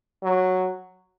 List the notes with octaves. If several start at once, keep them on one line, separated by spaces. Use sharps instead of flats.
F#3